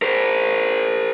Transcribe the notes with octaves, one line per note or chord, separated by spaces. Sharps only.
A#4 C5